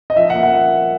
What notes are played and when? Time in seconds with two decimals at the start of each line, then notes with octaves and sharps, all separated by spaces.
0.10 D#5
0.16 F3 E5
0.30 A#3 F#5
0.43 F#5